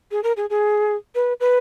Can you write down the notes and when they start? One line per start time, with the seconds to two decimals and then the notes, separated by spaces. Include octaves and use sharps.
0.11 G#4
0.23 A#4
0.37 G#4
0.50 G#4
1.15 B4
1.40 B4